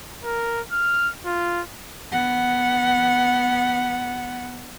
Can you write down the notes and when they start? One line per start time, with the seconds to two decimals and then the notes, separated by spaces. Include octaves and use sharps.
0.23 A#4
0.72 F6
1.25 F4
2.13 B3 F#5